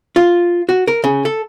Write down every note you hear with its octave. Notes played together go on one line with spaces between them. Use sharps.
F4
F#4
A#4
C#3
A4